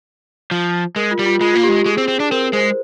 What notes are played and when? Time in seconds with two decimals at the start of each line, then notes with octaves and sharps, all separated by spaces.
0.51 F3
0.96 G#3 A#4
1.11 F4
1.19 G3
1.26 F4
1.41 G#3 F4
1.53 A#3 F4
1.64 G4
1.69 G#3
1.86 G#3 G#4
1.98 C4
2.08 C4
2.20 D4
2.31 C4 A#4
2.53 G#3 C5